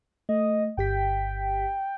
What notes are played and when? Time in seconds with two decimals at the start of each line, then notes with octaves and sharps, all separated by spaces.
0.29 A3 D#5
0.77 G1 G4 G5 B6